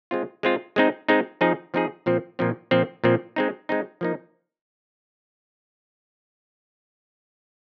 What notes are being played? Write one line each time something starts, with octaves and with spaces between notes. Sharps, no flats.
G#3 C4 F4
G#3 C4 F4
G#3 C4 D#4
G#3 C4 D#4
F3 C4 D#4 G#4
F3 C4 D#4 G#4
A#2 F3 C4
A#2 F3 C4
A#2 F3 C4
A#2 F3 C4
G#3 C4 D#4
G#3 C4 D#4
F3 A#3 D#4